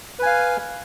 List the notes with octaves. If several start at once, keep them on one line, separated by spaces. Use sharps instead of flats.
B4 F5 G#5